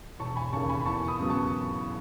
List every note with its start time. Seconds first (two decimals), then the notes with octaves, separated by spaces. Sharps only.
0.20 E1 A5 C#6
0.36 G#5 B5
0.53 D#2 C#3 A5 C#6
0.69 G#5 B5
0.81 B5
0.86 E2 A5 C#6
1.08 B5 D#6
1.19 C#3 F#3 B3
1.30 A5 C#6